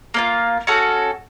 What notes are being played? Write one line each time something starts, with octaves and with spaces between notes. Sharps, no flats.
A#3 D4 F4
C#4 F#4 A4